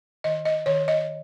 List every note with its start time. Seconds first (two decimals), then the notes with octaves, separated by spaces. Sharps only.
0.24 D#3 D#5
0.45 D#5
0.66 D#3 C#5
0.88 D#5